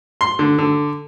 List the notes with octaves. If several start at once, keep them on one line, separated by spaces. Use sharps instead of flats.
C6
D3
D3